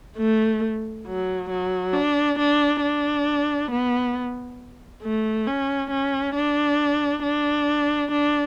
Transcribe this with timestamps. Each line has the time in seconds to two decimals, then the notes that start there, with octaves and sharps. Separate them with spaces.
0.18 A3
1.07 F#3
1.50 F#3
1.94 D4
2.39 D4
2.82 D4
3.71 B3
5.03 A3
5.47 C#4
5.91 C#4
6.36 D4
7.24 D4
8.12 D4